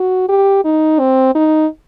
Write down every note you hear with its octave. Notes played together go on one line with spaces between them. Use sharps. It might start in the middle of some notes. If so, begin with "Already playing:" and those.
Already playing: F#4
G4
D#4
C4
D#4